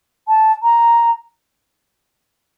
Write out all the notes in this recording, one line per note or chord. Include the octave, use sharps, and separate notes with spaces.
A5
A#5